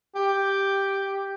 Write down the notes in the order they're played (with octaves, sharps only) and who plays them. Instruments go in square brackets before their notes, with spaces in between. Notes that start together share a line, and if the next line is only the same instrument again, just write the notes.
[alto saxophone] G4